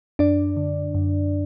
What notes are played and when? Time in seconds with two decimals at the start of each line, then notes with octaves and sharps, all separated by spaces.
0.19 F#2 D4 D5
0.57 D3
0.95 F#2